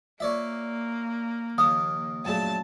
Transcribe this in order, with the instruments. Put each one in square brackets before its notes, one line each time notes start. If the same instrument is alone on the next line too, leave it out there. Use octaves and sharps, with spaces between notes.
[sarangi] A#3 [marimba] F4 [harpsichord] C#5 D5 E5
[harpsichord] D#2 F5 [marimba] C#3 F3 [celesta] D#6
[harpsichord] F#2 A#2 C#3 [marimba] A3 C#4 [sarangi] A5